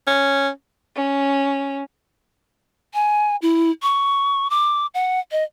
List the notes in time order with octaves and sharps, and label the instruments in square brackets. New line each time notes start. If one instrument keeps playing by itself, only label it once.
[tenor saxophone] C#4
[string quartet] C#4
[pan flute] G#5
E4
C#6
D6
F#5
D#5